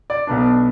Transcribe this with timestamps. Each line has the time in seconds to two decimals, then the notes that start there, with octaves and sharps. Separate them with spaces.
0.10 D5
0.27 B1 B2 B3 D4